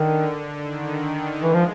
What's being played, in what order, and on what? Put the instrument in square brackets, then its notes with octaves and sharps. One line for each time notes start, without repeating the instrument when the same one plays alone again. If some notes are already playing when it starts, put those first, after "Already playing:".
Already playing: [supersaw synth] D3 [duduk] D#3
[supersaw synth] D#3
[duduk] E3 [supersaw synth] G#3
[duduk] F3